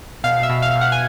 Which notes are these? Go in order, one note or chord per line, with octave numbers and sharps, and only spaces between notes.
B2 F5
E5
B2
F5
B2
F#5
G#5